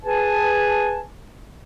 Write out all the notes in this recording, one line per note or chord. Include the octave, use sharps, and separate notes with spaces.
G#4 B4 G#5 A5